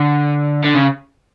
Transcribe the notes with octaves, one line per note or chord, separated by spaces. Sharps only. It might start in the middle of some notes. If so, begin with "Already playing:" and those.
Already playing: D3
D3
C#3